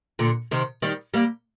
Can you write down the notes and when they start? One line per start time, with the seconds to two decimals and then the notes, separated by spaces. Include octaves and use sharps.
0.19 A#2 D3
0.51 C3 D#3
0.82 D#3 G3
1.14 G3 A#3